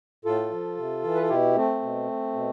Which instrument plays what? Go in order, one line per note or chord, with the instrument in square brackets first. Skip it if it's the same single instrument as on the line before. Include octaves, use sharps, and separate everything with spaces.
[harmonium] A2 F4 A4
F3
C3
E3
B4
A4
B2 E4 G4
A3 C4
B2
B2